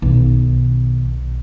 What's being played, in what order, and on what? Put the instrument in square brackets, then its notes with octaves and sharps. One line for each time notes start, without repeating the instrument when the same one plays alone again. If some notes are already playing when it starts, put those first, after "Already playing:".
[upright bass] B1 D#3